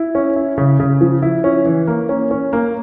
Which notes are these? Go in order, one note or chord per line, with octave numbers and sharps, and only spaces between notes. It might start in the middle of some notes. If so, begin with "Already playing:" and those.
Already playing: E4
C#4
E4
C#3
C#3
F3
E4
C#4
E3
A#3
C#4
C#4
A#3